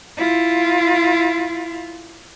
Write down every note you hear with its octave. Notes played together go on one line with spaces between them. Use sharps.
E4 F4